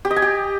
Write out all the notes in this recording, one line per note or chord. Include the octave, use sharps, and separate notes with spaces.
G4
D#5
G#5
G4